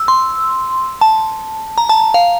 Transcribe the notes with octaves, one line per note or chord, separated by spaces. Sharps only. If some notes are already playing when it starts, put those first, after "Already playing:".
Already playing: E6
C6
A5
A#5
A5
F5